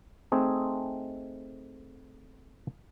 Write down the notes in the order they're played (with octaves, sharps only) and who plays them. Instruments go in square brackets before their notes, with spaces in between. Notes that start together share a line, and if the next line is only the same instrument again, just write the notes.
[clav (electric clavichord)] A3 C4 D#4 G#4